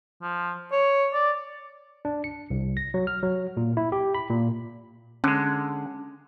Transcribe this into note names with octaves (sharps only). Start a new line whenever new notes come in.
F3
C#5
D5
D4
C#7
C2
A#6
F#3
F6
F#3
A#2
E4
G4
B5
A#2
D3 G#3 C#4